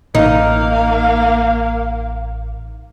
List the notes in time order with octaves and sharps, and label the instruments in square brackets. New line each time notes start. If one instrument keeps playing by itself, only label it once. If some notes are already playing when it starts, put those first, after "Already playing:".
[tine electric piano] A1 [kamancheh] A#3 F5 [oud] D#4